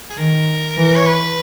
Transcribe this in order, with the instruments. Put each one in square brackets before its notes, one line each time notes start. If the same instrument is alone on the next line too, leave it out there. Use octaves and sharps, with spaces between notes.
[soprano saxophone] G#4
[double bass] D#3 [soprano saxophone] A#4
[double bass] E3
[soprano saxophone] C#5
B4